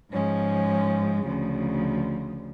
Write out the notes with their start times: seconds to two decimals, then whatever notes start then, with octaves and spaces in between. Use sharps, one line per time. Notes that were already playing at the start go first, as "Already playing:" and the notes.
0.11 G#2 F3 G#3 C#4
1.26 D2 C#3 F3